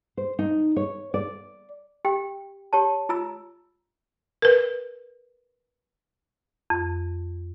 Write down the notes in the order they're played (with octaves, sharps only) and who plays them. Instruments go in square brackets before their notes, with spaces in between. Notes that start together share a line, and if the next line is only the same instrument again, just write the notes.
[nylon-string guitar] C5
D#4
C#5
D5
[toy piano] G4 G5
G4 C#5 A5
F4 A#5 E6
[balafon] A#4 B4
[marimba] F2